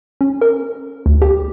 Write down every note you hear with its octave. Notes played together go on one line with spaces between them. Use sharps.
C#4
A#4
D2
G4